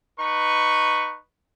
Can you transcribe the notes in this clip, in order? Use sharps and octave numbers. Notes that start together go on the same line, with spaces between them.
D#4 B4 C#6